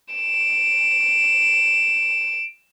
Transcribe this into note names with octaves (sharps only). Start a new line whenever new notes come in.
D7 E7